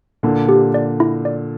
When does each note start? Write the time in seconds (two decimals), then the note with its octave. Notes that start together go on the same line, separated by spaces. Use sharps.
0.23 A#2 D3 E4
0.49 G4
0.74 D5
1.00 E4
1.25 D5